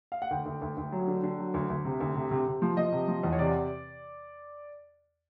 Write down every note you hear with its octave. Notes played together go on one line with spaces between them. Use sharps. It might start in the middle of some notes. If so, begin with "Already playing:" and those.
F5
F#5
D2 G5
D2
D2
D2
F#3
D3
D3
F#3
D2
D2
C3
D2
C3
C3
C3
F3
F3 D#5
C3
F3
E2
C#5
C3 D5